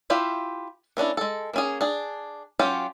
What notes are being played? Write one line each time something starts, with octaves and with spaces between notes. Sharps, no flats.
E4 F4 G4 E5
A#3 C#4 D4 E4
G#3 A4
A#3 C#4 G#4
D4 G#4
F#3 C#4 F4 G4